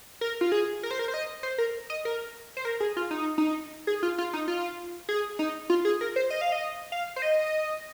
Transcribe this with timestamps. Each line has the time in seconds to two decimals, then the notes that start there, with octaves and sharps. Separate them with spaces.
0.21 A#4
0.41 F4
0.52 G#4
0.83 A#4
0.91 C5
0.99 A#4
1.08 C5
1.14 D#5
1.43 C5
1.58 A#4
1.90 D#5
2.05 A#4
2.57 C5
2.65 A#4
2.80 G#4
2.97 F4
3.11 D#4
3.38 D#4
3.87 G#4
4.03 F4
4.18 F4
4.33 D#4
4.48 F4
5.09 G#4
5.39 D#4
5.70 F4
5.85 G#4
6.01 A#4
6.16 C5
6.30 D#5
6.41 F5
6.52 D#5
6.92 F5
7.16 C5
7.22 D#5